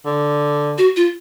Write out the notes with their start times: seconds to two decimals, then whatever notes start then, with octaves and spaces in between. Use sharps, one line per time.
0.06 D3
0.78 F#4
0.96 F4